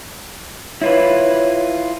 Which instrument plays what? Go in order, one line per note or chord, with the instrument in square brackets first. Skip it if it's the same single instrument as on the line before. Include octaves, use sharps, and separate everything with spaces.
[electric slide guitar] E4 F4 B4 [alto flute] C#5